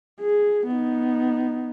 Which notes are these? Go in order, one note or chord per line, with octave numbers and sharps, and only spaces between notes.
G#4
B3 D#4